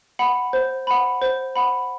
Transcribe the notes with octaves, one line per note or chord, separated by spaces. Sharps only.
F#5 B5
C5
F#5 B5
C5
F#5 B5